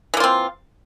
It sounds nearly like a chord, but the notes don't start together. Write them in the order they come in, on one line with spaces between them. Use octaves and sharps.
E3 A#3 F4 C4